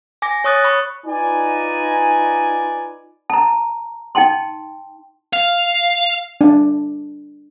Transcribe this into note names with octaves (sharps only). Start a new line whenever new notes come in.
G#5 D6 A#6
C#5 C#6 D#6 F#6 A6
B5 C#6
D#4 F4 B4 D5 G#5
A5 A#5
D#4 G5 A5 C6
F5
D4